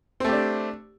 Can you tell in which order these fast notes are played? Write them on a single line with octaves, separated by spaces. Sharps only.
C4 A3 G4 D4